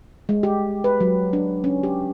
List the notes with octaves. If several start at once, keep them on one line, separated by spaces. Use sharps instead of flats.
G#3
G4
B4
F#3
D4
C#4
G4